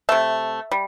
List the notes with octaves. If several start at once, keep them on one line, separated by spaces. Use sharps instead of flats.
C3 A3 E5
G3